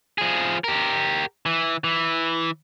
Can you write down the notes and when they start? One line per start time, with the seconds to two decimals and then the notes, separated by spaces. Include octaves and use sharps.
0.18 F3 G#4
0.64 G4 A#4
1.46 E3
1.84 E3